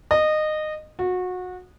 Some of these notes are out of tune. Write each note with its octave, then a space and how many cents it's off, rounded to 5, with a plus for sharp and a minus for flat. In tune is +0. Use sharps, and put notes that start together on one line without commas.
D#5 -20
F#4 -25